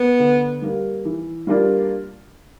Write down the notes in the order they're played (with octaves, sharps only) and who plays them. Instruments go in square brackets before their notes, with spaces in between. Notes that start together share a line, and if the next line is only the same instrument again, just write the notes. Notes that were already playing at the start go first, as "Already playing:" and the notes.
Already playing: [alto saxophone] B3
[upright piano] D3
G3 A#3
E3
G3 A#3 D4 F4